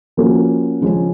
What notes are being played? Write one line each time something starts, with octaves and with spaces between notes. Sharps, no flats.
F3 A#3 C#4 F#4
C#3 F3 G#3 C#4